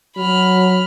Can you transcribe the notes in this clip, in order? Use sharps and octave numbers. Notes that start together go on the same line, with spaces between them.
F#3 B5 F6